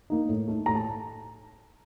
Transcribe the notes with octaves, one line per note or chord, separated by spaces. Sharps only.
A#3 D#4
A2
A3 D#4
A2 A#5
A5